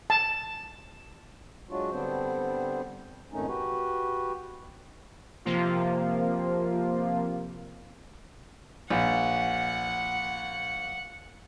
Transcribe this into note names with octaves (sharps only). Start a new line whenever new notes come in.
A5
F#3 G#3 D4 F4 F#4
D3 G3 B3 C4 D4 C5
F2 G#2 D#3 A3 C#4 D#4
F#4 G4 B4
C3 F3 A#3 F4
A#1 F#5